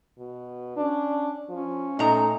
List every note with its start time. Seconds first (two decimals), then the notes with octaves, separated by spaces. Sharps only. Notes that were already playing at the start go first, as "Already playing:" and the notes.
0.18 B2
0.76 C#4 D4
1.49 F3 C#4
1.99 A#2 A3 D#4 A#5